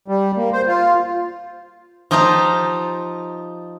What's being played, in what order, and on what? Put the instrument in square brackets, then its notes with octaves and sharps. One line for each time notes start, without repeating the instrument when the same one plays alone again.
[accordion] G3
A#3
C5
F4
[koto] F3 D#4 F4 G4 A5 A#5